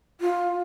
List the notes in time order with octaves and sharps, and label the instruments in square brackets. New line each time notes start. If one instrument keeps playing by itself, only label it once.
[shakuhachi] F4